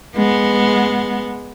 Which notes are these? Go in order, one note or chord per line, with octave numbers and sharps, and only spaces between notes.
G#3 B3